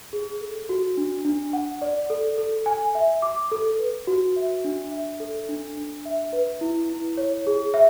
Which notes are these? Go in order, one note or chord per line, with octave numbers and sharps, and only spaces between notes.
G#4
A4
F#4
D4
D4
F#5
D5
A4
A4
G#5
E5
D6
A4
B4
F#4
E5
D4
E5
A4
D4
D4
E5
B4
E4
E4
C#5
G#4
E5